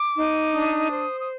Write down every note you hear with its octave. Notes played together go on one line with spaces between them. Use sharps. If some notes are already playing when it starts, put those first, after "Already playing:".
Already playing: D6
D#4
D4 D#6
C5
D#6